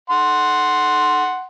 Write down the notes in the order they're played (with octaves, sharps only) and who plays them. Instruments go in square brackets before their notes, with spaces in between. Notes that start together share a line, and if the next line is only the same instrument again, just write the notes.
[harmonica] F#5 C6